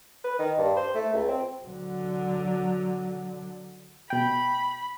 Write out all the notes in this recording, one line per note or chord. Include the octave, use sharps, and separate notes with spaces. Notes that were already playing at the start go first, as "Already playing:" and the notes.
B4
D#3
G2
C5
A3
C#2
C4
D3 F#3
B2 G5 B5